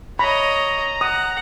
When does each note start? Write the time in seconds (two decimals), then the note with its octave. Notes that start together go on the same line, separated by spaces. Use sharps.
0.19 C#5 D#5 A#5 B5
1.01 F#5 D#6